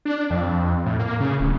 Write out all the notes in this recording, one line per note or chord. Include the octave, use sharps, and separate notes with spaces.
D4
F2
A2
A#3
C#3
D1